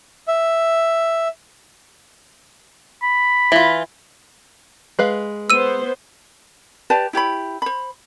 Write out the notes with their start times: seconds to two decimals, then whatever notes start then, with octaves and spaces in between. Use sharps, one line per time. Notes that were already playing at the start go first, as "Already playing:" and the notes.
0.28 E5
3.03 B5
3.52 E3 F4
4.99 G#3 B4 F5
5.50 B3 C5 E6 D#7
6.90 G4 B4 D5 A5
7.13 E4 G4 C#5 B5
7.62 C5 B5